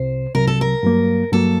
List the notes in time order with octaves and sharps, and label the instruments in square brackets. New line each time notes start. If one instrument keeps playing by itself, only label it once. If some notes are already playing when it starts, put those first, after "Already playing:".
Already playing: [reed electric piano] C2 C3 [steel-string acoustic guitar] C5
[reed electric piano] C2 C3 F#3 [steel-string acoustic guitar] A#4
[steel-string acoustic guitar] A4
A#4
[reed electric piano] G2 F#3 A#3
[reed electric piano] G2 F#3 A#3 [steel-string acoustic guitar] A4